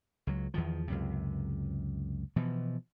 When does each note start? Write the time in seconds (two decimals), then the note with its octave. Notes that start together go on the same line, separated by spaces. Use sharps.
0.27 C#2 F#3
0.54 E2 D#3 F3
0.88 C#2 F#2 C3
2.36 B2 E3 F3